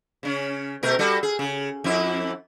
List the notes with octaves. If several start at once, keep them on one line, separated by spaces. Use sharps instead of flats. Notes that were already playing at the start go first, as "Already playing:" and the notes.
C#3 C#4
B2 A3 A#4
G3 F#4 A4
G#4
C#3
F2 E4